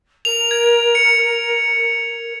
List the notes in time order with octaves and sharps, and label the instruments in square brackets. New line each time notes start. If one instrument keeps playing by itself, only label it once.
[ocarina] A#4 [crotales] F7
[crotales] G#6
C#7